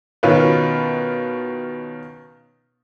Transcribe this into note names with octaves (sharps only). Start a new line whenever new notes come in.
B2 D#3 C#4 F4 B4